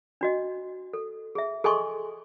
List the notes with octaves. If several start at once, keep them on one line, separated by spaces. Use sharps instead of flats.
D4 F#4 D#5
A4
G#4 E5
G#4 A4 D#5 G#5 C6 C#6